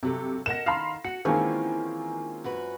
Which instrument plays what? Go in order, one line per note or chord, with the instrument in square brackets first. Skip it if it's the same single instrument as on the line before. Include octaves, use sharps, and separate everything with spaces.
[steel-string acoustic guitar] G2 F#3 A4 [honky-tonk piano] C3
[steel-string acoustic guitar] A#4 D#5 F#5 [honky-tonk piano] A#6 E7
[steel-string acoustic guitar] D#3 [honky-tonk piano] F5 B5 C6
[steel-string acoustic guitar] F#4 [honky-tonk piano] C#7
[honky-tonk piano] D#3 G#3 A#3 [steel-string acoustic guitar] E3 [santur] C4 C#4 F4
[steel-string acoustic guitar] F#2 F#4 B4